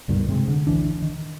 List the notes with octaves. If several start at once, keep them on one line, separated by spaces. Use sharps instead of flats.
C#2 G2 B2 D#3
G#2 C3 G#3
D3
A1 D2 E3 D4
D#3